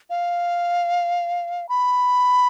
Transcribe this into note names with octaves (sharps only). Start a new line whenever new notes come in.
F5
B5